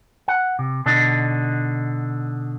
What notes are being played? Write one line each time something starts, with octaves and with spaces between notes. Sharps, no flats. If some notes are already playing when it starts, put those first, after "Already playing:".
F#5
C3
B2 D3 D4 D#4